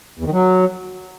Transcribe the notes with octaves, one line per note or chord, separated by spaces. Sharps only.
E2
D#3
F#3